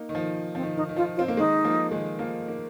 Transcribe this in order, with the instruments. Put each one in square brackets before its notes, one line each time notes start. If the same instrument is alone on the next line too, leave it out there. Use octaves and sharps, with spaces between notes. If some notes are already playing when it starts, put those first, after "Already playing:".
Already playing: [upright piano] A#3 D#4
D#3
F3
[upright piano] F3 [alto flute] C4
[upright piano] D#3
[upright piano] D#3 [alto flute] D#4
[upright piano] D#3
[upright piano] F3 [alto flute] F4
[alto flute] F4
[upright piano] C4
A#3
[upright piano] D#3 G#3 [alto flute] D#4
[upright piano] F3 A#3
D#3 G#3
F3 A#3
A#3